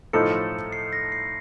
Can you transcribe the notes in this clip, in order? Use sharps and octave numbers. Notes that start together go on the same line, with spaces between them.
A2 F3 A3 D#4 A4 C#7
C7
A#6
C7